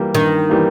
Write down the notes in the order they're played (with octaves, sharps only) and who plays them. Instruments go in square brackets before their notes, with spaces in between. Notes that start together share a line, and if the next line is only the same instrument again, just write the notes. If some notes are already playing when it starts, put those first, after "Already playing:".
Already playing: [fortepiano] E3 G3 A#3
[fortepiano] G2 [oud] D#3
[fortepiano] E3 G3 A#3